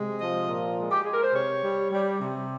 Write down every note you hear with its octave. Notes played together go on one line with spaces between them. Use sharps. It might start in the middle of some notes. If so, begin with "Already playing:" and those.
Already playing: C3 G#3
F3 D#5
A#2
G#3
G4
G#3 G#4
A#4
C5
C3 C#5
G3
G3
C3